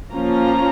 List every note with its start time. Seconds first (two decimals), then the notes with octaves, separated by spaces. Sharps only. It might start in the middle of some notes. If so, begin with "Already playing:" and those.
0.12 F3 A#3 C#4 F4 A#5